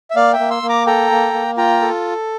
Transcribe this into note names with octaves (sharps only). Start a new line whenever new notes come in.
E5
A#3 D5 F5
E5 G5
A#3
C6 E6
A#3
A#5 D6
A4 G5 A#5
A#3
A#3
F4 G5 A#5
A4